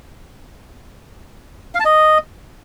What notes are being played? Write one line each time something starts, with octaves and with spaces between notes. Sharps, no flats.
F5
A5
D#5